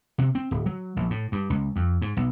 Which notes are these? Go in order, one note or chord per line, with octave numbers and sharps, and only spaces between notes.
C3
C4
D1
F#3
A#1
A2
G2
C#2
F2
G#2
B1